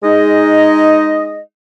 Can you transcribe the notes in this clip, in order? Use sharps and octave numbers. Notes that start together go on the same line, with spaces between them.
G#3 D#4 D#5